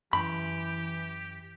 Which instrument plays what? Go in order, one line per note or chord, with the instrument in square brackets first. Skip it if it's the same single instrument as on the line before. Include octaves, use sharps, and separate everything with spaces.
[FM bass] F#2 [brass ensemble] E3 [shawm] G4 [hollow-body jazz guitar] B5